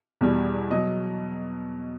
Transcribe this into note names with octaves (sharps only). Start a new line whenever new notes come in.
E2 B2 G3
B2 F#3 D#5